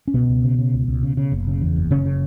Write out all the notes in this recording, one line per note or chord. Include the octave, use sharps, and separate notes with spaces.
C#4
C#2 B2 B3
C#2
C#3
C#3
C#2
C#2
C#3
C#3
F#1
C#3
E2
F#1
F#1 C#3 C#4
C#3